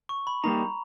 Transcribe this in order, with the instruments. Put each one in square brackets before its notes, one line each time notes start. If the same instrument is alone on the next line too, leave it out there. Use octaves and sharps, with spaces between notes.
[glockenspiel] C#6
B5
[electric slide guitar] G3 A#3 D#4 [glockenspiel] A#5